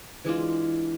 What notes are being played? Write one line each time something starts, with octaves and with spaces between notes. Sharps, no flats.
E3 G#3 D4 F4